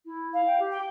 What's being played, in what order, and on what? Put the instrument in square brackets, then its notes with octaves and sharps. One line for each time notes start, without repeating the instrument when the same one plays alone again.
[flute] E4
[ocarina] F5
[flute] G5
G4
[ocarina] G5